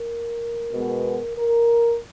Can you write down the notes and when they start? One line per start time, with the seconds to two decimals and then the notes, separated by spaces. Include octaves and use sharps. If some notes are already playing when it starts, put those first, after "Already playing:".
Already playing: A#4
0.73 B2 G#3 B3
1.37 A#4